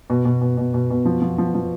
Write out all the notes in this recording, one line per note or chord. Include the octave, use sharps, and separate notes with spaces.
B2
B2
B2
B2
B2
B2
F3
F3
F3
F3